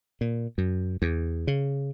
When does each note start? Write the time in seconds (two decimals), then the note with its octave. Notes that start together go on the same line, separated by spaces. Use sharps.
0.21 A#2
0.58 F#2
1.02 E2
1.47 C#3